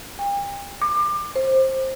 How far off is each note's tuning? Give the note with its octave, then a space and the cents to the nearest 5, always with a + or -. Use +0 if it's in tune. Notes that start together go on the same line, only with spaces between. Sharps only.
G5 +40
D6 +25
C5 +15